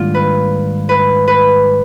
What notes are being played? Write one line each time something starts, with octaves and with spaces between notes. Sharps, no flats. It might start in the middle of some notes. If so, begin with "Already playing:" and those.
Already playing: G#2 D#3 G3 A#3 D4 F4
B4
B4
B4